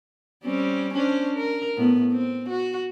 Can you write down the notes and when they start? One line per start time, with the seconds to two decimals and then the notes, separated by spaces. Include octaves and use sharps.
0.45 G3 C4 C#4
0.94 C#4 D4 C5
1.35 A#4
1.77 A2 B3
2.12 C4
2.49 F#4